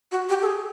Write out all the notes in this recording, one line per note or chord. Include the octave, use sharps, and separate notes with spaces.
F#4
G4
A4
G#4